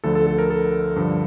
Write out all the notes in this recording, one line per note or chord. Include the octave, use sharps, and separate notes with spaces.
D2 D3 F3 A4
A4
A4
A#4
A4
G2 D3 F3